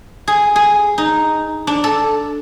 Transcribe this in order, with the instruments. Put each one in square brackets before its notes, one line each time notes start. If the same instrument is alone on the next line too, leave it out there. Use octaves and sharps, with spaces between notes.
[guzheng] G#4
G#4
D#4
D4
A4